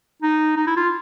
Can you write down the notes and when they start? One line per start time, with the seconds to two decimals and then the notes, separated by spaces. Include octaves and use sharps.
0.22 D#4
0.56 D#4
0.67 E4
0.77 F4